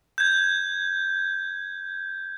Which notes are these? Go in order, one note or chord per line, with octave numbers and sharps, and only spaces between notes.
G6 G#6